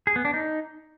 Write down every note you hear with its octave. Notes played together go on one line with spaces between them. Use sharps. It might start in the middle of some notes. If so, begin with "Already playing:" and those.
G#4
B3
D4
D#4